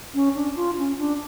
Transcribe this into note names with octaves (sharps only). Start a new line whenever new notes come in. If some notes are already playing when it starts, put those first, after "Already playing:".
C#4
D4
F4
C#4
D4